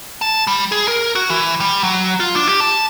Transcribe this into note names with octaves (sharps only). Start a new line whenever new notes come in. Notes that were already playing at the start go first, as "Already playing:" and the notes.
A5
G3
G#4
A#4
F#4
E3
G3
F#3
F4
D4
G4
A5